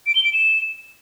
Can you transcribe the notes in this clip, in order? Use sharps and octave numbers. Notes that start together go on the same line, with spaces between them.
D7
G7
D7
E7